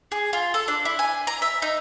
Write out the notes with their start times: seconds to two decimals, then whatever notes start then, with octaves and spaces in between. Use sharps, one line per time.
0.12 G#4
0.33 F4
0.54 A4
0.68 D4
0.85 E4
0.99 G#5
1.27 A#5
1.42 E5
1.62 D#4